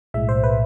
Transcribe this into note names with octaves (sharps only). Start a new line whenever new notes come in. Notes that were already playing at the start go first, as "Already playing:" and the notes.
B1 A2 G#3 E5
C5
B4